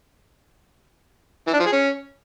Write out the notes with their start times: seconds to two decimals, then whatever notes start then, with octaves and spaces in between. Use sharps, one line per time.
1.47 E3
1.53 D4
1.60 F3
1.66 G#4
1.72 C#4